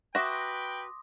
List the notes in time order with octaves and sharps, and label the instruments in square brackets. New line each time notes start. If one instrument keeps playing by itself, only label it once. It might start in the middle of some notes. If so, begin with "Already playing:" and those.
[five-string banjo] F#4 E5 [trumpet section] B4 G5 [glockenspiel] C6 D6 D#6 [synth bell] A#6